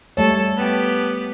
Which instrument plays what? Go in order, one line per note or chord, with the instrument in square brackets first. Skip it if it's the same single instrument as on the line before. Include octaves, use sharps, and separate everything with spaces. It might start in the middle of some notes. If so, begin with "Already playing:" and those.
[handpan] G3 A3 C#5 [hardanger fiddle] A4
[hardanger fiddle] B3 G4